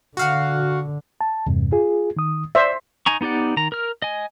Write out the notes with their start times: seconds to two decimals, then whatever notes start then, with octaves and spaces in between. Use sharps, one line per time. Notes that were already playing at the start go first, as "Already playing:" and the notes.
0.17 D3 F#4 F5 F#5
1.21 A5
1.47 E2 G2 C3
1.72 F4 G#4
2.17 D#3 D#6
2.55 C5 D5 E5
3.06 D#4 G#5 A#5 C#6
3.21 B3 D#4 G4 D5 F#5
3.57 D#3 A#5
3.72 A#4 F6
4.02 D#5 G#5